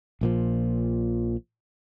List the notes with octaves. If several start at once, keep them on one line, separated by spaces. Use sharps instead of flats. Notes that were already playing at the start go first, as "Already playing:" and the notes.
A#1 A#2 F3